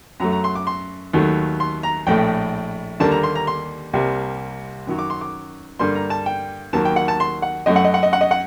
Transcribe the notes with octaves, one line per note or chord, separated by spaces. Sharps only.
F#2 F#3 A3 A#5
A#5
C6
D6
C6
D#2 D#3 F#3 A3
C6
A#5
A#1 A2 A3 G5
D#2 D3 G3 A#3 A5
A#5
C6
A#5
C6
C2 C3 G3 A#3
F#2 D#3 F#3
D6
C6
D6
G2 D3 G3 A#3 C6
A#5
A5
G5
D#2 D#3 F#3 A#3 A5
G5
F#5
A5
C6
F#5
F#2 F#3 A3 D#5
F#5
D#5
F#5
D#5
F#5
D#5
F#5